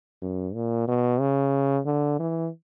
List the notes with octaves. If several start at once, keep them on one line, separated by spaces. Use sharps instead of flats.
F#2
A#2
B2
C#3
D3
E3